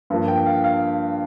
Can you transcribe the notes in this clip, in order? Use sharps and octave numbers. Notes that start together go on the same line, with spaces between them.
G2 F3 A#3
G5
F5
F5